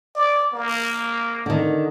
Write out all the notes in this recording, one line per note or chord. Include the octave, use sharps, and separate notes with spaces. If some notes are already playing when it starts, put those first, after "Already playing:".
D5
A#3
D3 D#3